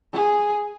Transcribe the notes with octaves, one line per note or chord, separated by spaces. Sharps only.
G#4